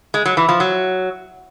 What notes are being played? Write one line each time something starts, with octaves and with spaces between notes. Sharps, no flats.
G#3
F#3
E3
F3
F#3